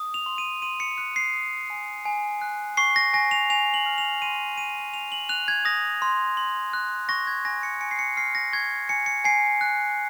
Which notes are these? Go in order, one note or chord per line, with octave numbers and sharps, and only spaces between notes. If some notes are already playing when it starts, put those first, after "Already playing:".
Already playing: D#6
F7
C6
D#7
C6 D#7
C#7
F#6 C#7
C7
D#6
G#5
G#5
F#6
C#6 C7
A#6
G#5 A#6
F7
G#5 F7
F#7
F6
F7
C6 D#7
G#5 D#7
G#5 F7
F#7
F#6 F7
G#6
D#6 A#6
C6
C6
F#6
C#6 A#6
G#6
G#5 A#6
C#7
G#5 C#7
C7
C#7
F6 C7
A#6
C#6 G#6
G#5 C#7
C#7
G#5 C7
F#6